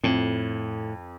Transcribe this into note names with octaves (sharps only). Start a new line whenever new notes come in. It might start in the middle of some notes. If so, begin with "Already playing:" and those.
F2 A2